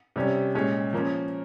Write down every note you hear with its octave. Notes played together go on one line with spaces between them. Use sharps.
C3 G3 C#4
A#2 G#3 C#4
F3 A#3 C#4